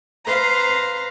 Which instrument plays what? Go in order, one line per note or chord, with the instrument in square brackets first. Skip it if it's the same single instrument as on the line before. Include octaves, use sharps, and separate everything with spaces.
[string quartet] B4 C5 F5 A#5